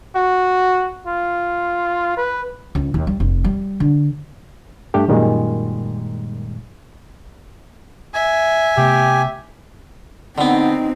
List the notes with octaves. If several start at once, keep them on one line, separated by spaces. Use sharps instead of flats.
F#4
F4
B4
C#2
D#2
G3
F1
G3
D3
G2 G3 A3 D4 G4
F#2 A#2 D#3 G3 G#3
E5 G#5
C3 A3 B3 G4
D3 B3 C4 D#4